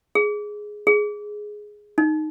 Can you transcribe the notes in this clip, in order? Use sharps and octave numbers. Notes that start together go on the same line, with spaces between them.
G#4
G#4
D#4